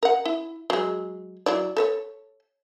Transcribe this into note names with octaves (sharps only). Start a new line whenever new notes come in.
A#4 F#5
E4
F#3 G#3
F#3 E4 D5
A4 B4 C#5